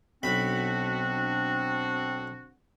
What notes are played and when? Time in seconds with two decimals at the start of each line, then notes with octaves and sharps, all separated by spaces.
0.23 B1 C4 D4 F#4 B5